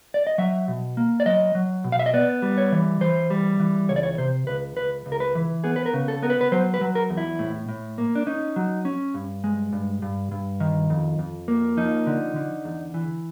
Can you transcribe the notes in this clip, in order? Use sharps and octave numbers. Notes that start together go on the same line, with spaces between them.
D5
D#5
F#3 E5
B2
A#3
D5
F#3 D#5
F#3
B2
F5
E5
D#5
B3 D5
G3
C#5
E3
E3 C5
G3
E3
C#2 C#5
D5
C#5
C3 C5
C#2 B4
C#2 B4
C#2
A#4
B4
E3
B3 G#4
B4
A#4
C#3
A4
B3 A#4
B4
B4
F#3 C5
B4
F#3
A#4
E2
E4
A2
A2
A#3
D4
C#4 D#4
F#3
C#4
G2
G#3
G2
G2
G2
D#3
F2
F2
A#3
F3 D#4
D3
D3
E2
E3